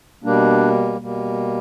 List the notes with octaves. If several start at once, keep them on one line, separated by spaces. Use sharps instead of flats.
B2 G3 A#3 D4
B2 G3 A#3